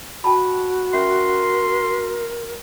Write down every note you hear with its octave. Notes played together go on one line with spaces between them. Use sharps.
F#4 G5 A5 B5
C#4 A#4 E5 C6